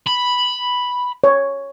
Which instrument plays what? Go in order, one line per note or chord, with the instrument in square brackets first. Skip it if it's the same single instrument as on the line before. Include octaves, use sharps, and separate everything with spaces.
[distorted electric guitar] B5
[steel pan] C#5